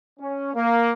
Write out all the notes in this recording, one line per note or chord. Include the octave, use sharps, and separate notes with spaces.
C#4
A#3